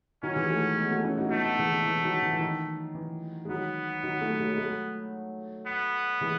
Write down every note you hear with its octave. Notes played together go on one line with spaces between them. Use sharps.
D#3 F#3 C#4
E3 G#3
F#3 A3
G#3 B3
F#3 A3
C#4 E4
D#4 F#4
A3 B3 D#4
B3 D#4
E3 G#3
E3
E3
D#3 F#3
E3
E3
D#3
E3
G#3
D#3 F#3 B3
D#3 F#3
F#3 A3
F#3 A3
G#3
F#3 A3
B3
E3 G#3